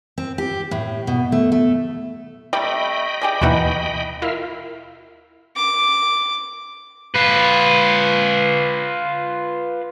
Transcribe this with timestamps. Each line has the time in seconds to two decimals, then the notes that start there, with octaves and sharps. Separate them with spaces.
0.18 C4
0.38 G4
0.71 A2
1.07 B2
1.32 A3
1.52 A3
2.53 C3 G3 A3 D5 D#5 G5 B5
3.21 G4 G#4 D5
3.42 D#2 B2 E3 D#4 E4 F#4
4.22 E4 F4 A#4 E5 F5
5.56 D6
7.15 F4 B4